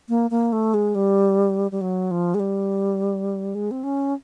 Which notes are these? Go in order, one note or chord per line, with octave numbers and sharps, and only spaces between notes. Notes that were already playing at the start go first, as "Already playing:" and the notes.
A#3
A#3
A3
G#3
G3
G3
F#3
F3
G#3
G3
G#3
C4
C#4